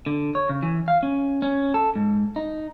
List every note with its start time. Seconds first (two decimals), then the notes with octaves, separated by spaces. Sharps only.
0.06 D3
0.35 C#5
0.49 C#3
0.63 E3
0.88 F5
1.03 C#4
1.42 C#4
1.74 A4
1.95 G#2
2.36 D#4